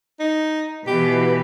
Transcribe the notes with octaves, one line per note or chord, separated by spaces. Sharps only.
D#4
B2 E3 G4 B4